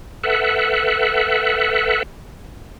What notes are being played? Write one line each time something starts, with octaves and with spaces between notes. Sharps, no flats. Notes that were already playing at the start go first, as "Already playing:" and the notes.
A4 B4 E5 F#5